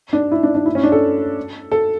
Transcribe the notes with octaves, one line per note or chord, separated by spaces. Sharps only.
D4
E4
D4
D4
E4
C#4
D4
A4
A4